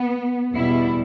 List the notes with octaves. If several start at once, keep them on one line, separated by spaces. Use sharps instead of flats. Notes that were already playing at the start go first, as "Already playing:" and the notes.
Already playing: B3
E2 B2 G3 E4